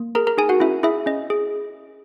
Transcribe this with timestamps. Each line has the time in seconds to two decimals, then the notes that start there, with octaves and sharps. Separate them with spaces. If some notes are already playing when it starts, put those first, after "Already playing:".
Already playing: A#3
0.15 G#4 A#4 A#5
0.27 A#4 A#5
0.37 D#4 G#4 G#5
0.49 F#4 F#5
0.60 C#4 E4 E5
0.83 E4 G#4 E5
1.06 C#4 D#5
1.30 G#4